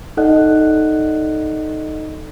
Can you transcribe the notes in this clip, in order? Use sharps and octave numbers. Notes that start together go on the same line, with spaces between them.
D#4 A4 D5 D#5 F#5 F#6